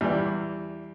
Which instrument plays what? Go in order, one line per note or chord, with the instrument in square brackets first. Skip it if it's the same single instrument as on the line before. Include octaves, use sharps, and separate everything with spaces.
[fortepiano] E2 E3 G3